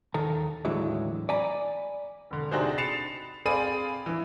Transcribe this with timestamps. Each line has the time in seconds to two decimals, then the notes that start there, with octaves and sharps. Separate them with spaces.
0.14 D#2 D#3 A4 A#5
0.65 D#2 A2 D3 E3 F#3 G#3
1.29 D5 G#5 A#5 B5
2.31 E1 D3
2.51 C3 D4 D#4 F#4 G#4 C5
2.78 B5 A6 C7 C#7 E7 F7
3.45 C4 G#4 D5 F5 B5 D#7
4.06 E3 E4